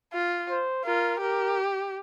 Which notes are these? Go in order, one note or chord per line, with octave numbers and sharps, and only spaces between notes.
F4
C5
F4 A#4
G4 A#4